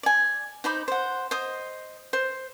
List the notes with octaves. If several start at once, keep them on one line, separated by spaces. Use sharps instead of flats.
D5 G#5
D#4 C5 B5 D6
C5 F#5
C5 D#5 D#6
C5